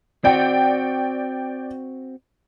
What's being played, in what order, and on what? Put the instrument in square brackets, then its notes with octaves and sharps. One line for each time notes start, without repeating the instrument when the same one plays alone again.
[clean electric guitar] C4 F#4 [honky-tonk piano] D5 G5